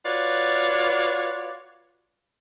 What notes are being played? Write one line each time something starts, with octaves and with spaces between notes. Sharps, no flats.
F4 F#4 B4 C#5 D5